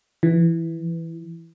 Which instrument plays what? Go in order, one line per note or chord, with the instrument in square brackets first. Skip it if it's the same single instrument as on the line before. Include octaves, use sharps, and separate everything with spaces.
[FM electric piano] E3